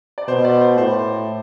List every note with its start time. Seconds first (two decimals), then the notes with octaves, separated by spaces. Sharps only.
0.18 D5
0.28 B2 C5
0.45 D5
0.61 C5
0.78 A2 C5